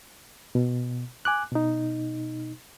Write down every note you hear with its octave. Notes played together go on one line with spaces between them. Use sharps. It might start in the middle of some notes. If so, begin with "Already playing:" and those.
B2
G#5 D6 F#6
B2 D#4